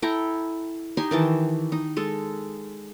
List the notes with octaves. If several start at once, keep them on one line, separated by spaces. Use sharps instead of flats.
E4 A4 G5 A#5
D#4 G4 G#5 C6
D#3 E3 A5
D#4
G#3 A4